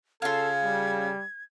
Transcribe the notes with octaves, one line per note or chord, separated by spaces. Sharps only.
C#3 F4 A4 F5 G#6
G3